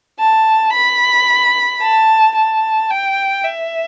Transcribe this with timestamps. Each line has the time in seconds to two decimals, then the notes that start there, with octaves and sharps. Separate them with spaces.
0.19 A5
0.73 B5
1.81 A5
2.36 A5
2.90 G5
3.44 E5